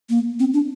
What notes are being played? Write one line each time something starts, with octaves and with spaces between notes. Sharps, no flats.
A#3
C4
D4